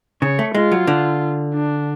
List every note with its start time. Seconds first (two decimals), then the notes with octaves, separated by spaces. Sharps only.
0.22 C#3 C#5
0.39 A3
0.55 G#3 F4
0.72 F#3
0.87 D3
1.55 D4